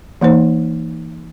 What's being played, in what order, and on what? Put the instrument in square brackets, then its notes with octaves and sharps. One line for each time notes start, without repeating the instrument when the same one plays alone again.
[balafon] E3 A#3 D#4 C5